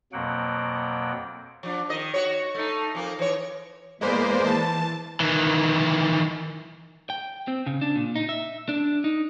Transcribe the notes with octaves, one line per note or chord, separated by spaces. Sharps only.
F2 B2 F#3 A#3 F#5 G5
F3 D4
D#3 D#5
F#4 C#5
A3 D#4
F2 A#3
E3 C#5
E2 G#3 A#3 B4 C5 D5
E3 A5
D#3 E3
G5
C4
C#3
D4
A#2
D#4
E5
D4
D#4